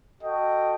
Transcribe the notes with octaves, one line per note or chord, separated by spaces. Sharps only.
F#4 A4 D#5 G5